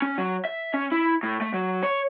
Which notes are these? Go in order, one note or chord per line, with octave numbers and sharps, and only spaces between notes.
C#4
F#3
E5
C#4
E4
A2
A3
F#3
C#5